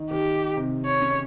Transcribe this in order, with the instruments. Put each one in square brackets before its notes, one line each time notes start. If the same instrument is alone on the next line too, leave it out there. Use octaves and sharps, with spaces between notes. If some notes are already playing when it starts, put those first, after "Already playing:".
Already playing: [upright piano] D#3
[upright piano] D#3 [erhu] G4
[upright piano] C3
[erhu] C#5
[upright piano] C#4